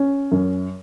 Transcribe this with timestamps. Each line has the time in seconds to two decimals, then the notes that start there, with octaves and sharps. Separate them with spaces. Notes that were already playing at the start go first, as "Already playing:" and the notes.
Already playing: C#4
0.32 F#2